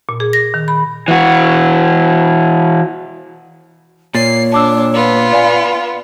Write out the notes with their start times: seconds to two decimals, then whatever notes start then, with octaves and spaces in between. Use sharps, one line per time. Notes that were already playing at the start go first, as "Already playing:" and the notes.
0.09 A#2
0.20 G#4
0.33 A#6
0.54 D#3
0.68 B5
1.08 E3 F#4
4.15 A#2 C#5 A6 C7
4.52 D4 A5 D6 E6
4.94 B3 F4
5.32 D5 F5 G#5